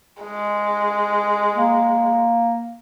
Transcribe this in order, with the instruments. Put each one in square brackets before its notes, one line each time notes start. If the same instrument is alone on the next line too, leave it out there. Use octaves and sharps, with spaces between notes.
[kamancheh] G#3
[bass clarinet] A#3